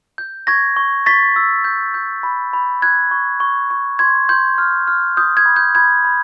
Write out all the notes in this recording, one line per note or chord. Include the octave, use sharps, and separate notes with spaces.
G6
C#6 G#6 A#6
C#6
C#6 A6 B6
E6
G6
G6
B5
B5
F#6 G#6
C#6
C#6
C#6
C6 G#6
C6 G6
F6
F6
D#6 G6
G#6
B5
G6
B5 G#6
B5